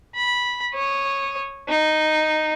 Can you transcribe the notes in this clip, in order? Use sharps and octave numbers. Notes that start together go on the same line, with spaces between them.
B5
C#5 D#6
D#4